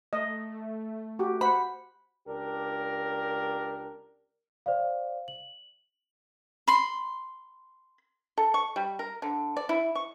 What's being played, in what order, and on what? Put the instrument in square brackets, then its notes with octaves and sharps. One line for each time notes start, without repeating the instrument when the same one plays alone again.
[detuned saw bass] A3 [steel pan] D#5
[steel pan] F#4 G4
[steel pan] C5 F#5 [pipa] B5
[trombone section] C#2 D4 G4 A#4
[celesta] C5 D5 F5
F#7
[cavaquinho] B5 C6
[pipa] A4
C#6
G3
A#4
D3
D5
E4
C#6